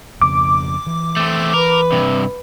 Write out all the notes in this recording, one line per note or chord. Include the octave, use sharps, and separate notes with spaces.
F2 C#3 D6
E3
A3 C4
A#4 B4
G2 C3